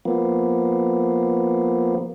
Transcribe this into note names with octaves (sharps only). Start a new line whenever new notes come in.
F3 A#3 B3